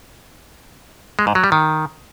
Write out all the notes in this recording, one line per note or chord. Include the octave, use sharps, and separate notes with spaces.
G#3
G#2
F#3
G3
D#3